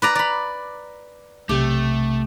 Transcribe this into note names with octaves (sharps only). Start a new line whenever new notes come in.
B4 D5 A#5
D5 B5
B1 C3 A3 G4